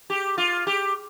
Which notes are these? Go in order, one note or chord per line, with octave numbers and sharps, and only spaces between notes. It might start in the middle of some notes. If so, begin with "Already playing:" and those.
G4
F4
G4